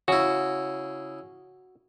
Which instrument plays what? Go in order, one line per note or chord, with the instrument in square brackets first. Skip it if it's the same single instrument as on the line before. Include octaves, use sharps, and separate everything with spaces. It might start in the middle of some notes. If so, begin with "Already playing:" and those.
[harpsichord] C#3 E4 [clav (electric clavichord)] F#4